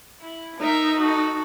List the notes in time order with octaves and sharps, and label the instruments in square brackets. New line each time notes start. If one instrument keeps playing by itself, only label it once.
[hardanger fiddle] E4
[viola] D#4 [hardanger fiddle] A#4 E5
[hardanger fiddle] F#4 A4